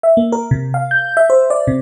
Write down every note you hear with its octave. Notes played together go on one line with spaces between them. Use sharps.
E5
A#3
A#4
C3
F5
G6
E5
C5
D5
C3